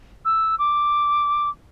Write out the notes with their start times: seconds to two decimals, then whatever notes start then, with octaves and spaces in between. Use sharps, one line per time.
0.25 E6
0.59 D6